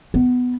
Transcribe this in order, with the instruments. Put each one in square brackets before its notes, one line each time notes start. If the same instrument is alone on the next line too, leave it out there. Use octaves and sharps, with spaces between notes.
[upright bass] B3